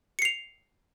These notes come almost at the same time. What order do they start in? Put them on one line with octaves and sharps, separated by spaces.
C#7 C7 F7